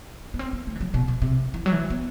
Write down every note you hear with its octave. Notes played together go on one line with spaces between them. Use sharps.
B3
C4
B3
A3
E3
F#3
B2
B2
C3
E3
F#3
E3
B3